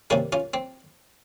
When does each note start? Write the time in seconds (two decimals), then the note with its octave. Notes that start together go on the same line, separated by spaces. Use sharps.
0.10 C3 D#3 G3 A#3 C#4
0.33 C#4 F4
0.54 C4